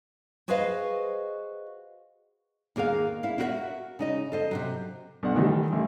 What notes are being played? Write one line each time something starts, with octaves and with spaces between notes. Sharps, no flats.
F#4 G#4 B4 C5 D#5 F5
D#2 A#3 G#4 A#4 F5
E4 F5
E4 F#4 A#4 B4 E5 F#5
C#3 D#4 D#5
A4 C5 D#5
C3 E3 F#3
B1 D4 F#5
A2 D#3 E3 G3
A1